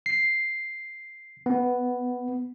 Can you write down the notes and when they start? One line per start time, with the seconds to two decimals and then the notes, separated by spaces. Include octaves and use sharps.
0.06 C7
1.46 B3